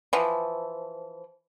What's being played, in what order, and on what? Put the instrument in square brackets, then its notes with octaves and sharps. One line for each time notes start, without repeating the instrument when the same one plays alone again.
[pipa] E3 F3